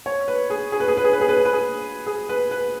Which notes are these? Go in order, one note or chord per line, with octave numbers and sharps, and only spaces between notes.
C#5
B4
G#4
G#4
B4
G#4
B4
G#4
B4
G#4
B4
G#4
B4
G#4
G#4
B4
B4